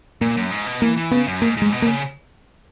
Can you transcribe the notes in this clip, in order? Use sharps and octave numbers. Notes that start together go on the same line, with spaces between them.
A#2 A#3
F#2
G#2
B2
E3 A#3
E3
C#3 B3
F#2
G#2 A#3
G#2 G#3
B2
A#3
C#3